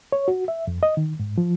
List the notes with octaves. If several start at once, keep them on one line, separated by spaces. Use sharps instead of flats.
C#5
F#4
E5
F2
D#5
D#3
G#2
F3